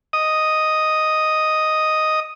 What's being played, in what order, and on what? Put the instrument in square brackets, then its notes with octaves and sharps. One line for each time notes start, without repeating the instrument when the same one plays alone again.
[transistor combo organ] D#5 D#6